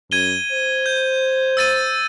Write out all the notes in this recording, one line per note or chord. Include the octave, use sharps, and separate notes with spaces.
F#2 G#6 D#7 G7
C5
G6
E6 A6 D#7